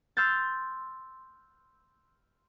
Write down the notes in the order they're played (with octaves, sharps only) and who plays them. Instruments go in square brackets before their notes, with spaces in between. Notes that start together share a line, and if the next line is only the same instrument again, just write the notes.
[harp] C6 E6 F6 G6 A6